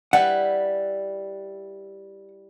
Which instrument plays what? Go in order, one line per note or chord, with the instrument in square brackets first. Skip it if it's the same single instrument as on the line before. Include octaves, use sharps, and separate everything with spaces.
[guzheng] G3 E4 B4 [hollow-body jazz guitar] F#5